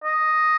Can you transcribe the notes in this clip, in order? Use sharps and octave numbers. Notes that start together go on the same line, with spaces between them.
D#5